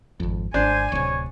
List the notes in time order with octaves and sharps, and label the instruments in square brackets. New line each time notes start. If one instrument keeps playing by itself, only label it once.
[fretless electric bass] G#1 F2
[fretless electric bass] G#1 [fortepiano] D4 [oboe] C5 [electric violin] G#5
[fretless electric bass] D1 C3 [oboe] C#5